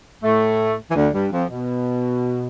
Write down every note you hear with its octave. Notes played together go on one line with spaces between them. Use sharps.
A2 A3
E3
D2 D3
G2 G3
F2 F3
B2